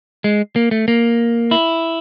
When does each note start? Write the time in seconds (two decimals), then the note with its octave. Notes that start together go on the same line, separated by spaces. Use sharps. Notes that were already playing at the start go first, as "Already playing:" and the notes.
0.24 G#3
0.56 A#3
0.71 A3
0.88 A#3
1.51 E4